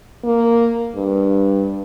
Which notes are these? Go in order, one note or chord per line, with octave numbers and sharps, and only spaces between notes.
A#3
G2